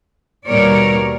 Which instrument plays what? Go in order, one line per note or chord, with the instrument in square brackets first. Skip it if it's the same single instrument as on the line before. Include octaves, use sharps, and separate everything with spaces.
[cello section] D#2 B2 G3 A#4 C#5 D5